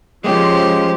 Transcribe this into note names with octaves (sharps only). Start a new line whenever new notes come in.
F3 G#3 A#3 C#4 G4